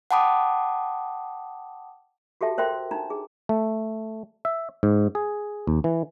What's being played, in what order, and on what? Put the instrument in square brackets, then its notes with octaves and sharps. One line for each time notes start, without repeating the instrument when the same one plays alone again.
[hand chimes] F#5 G5 A5 B5 D6 D#6
[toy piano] F#4 G4 A4 E5 A5
A#4 C5 E5 G5 C6
D4 D#4 A#5
G#4
[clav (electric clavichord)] A3
E5
G#2
G#4
D#2
E3